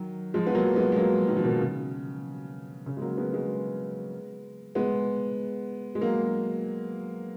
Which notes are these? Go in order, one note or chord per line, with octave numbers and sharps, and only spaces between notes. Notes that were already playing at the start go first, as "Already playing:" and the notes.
Already playing: D#3 F#3
F3 G#3
B3
F#3 A#3
G#3 B3
G#3
F#3 A#3
D#3 F#3
F3
B2 D#3
C#3
C#3
G#3
F#3 A#3
G#3 B3
G#3 B3
G#3 B3
G#3
F#3 A#3